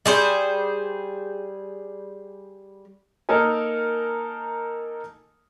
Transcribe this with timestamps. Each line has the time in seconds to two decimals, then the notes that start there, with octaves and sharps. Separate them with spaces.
0.06 G3 G#4 C5
3.29 A#3 D#4 A4 A#4 G#5